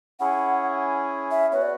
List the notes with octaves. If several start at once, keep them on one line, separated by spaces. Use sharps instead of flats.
C#4 E4 G#4 F#5
E5
B3 F#4 B4 C#5 F#5
D5